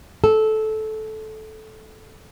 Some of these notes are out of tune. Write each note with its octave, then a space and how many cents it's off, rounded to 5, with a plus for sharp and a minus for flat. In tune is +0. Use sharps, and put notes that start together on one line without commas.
A4 -15